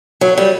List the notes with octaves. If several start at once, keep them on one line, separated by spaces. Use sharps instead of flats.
F#3
G3